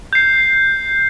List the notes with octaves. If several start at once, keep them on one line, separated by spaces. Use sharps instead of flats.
G6 C7